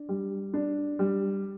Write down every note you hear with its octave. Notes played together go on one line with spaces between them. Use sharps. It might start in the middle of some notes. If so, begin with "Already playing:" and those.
Already playing: D4
G3
D4
G3